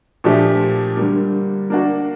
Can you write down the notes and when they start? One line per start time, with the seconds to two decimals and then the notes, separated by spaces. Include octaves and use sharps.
0.24 A#2 F3 A3 D4 G4
0.97 D3 G3 A#3
1.70 A#3 D4 F#4